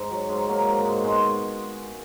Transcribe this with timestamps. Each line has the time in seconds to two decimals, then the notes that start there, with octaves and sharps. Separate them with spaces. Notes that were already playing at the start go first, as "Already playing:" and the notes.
Already playing: G#2
0.11 F#3
0.29 G#2
0.48 F#3 A#3
0.66 G#2
0.85 G#2
1.04 B2 G#3